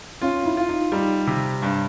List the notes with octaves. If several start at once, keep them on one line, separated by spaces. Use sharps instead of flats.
C#4 F4
E4
F4
D#4
G3 D#4
C3
G2